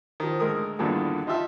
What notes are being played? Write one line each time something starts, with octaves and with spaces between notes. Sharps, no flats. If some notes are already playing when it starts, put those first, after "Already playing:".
D#3 F3
D2 G#3 A#4 D#6
E2 G2 A#2 D3 D#3
D#4 F4 G4 E5 A5 C6